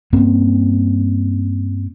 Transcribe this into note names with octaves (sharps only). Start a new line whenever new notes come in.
G2 A#3 C4 C#4